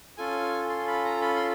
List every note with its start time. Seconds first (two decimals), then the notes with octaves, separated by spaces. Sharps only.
0.17 C#4 F4 A4 G#5
0.70 C6
0.88 B5
1.05 A#5
1.21 B5
1.36 C6